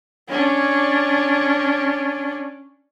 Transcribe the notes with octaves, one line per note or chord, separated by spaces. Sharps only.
C#4 D4